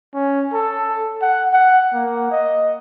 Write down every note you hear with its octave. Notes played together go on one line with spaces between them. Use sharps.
C#4
A4
F#5
F#5
A#3
D#5